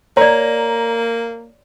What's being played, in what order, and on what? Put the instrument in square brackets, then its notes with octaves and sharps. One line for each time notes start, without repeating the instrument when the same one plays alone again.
[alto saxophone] A#3 [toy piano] C#5 D5 [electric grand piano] A#5